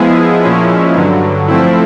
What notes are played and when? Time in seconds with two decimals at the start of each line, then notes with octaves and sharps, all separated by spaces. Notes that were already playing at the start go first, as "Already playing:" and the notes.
Already playing: F3 G#3 B3 E4 G#4
0.43 A#2 F3 G#3 C#4 E4
0.95 G2 D3 F#3
1.47 F3 A3 C4 E4